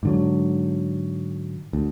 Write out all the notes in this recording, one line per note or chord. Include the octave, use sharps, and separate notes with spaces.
G#2 D3 F#3
D2